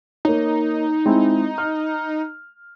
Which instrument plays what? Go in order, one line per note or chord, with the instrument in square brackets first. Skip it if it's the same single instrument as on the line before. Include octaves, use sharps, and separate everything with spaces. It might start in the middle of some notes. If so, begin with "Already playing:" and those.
[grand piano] A#3 C#5 [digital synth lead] D#4
[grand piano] G#3 C4 E4
F6